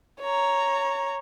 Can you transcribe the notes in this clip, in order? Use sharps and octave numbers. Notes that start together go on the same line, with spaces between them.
C#5 A#5